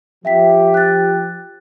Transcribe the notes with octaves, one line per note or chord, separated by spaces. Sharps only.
F3 G4 E5 G5 B6
F#6 A6